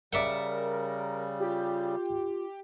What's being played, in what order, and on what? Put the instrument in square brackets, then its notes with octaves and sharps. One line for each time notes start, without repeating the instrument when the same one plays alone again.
[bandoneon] C#3 G3 [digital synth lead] A#4 [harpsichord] D5 E5 F#5
[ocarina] F4 [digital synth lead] G4